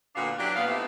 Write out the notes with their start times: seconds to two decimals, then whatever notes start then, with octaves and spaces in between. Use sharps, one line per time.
0.15 A#2 D3 B3 D4 F#4 F5
0.38 E3 F#3 D4 G4
0.55 A#2 B3 F5
0.67 A3 B3 C4 D#4 E4 G4